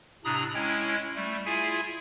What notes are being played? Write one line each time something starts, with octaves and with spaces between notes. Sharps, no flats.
A2 C3 D4 A#5 B5 D#6
G#3 C#4 E4 C#5 G5
G3 A3
E4 F4 G#4 E5 G#5